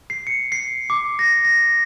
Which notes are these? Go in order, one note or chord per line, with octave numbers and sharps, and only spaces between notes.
C7
C#7
C7
D6
A#6
A#6